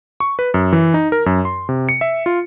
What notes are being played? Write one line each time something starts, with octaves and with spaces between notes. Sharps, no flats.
C#6
B4
F#2
E3
D#4
A#4
F#2
C6
C3
C#7
E5
F4